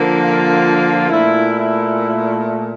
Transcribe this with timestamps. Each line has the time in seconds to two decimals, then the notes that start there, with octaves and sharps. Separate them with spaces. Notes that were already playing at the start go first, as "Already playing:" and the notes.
Already playing: D3 F3 A#3
0.19 F4
1.10 A#2 A3 E4
1.56 E4